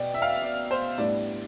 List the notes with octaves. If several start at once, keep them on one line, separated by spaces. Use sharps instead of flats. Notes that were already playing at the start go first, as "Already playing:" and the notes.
Already playing: B2 D5 G5
E5
F5
E5
D5
C5
A2 G3 B3 D4 D5